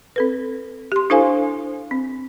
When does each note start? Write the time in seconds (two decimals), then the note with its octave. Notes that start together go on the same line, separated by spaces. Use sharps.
0.16 C4 A4 B4
0.92 G4 C6
1.10 D4 E4 A4 C5 F5 G#5
1.91 C4